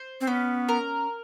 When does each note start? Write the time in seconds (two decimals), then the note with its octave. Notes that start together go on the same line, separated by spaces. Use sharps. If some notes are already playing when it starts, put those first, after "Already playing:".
Already playing: C5
0.21 C4
0.27 B3 C#4
0.69 A#4